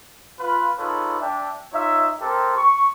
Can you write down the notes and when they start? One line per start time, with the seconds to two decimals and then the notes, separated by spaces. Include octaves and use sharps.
0.40 F4 B4
0.78 D#4 F4 G#4 A4 B4 C#5
1.20 D4 E5 G5
1.73 D#4 F4 C#5 E5
2.21 C4 G4 A4 A#4 C5
2.57 C#6